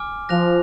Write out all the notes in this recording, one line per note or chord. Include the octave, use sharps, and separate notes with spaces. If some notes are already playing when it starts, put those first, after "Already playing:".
Already playing: G#5 D6 F6
F3 F#6 A#6 F7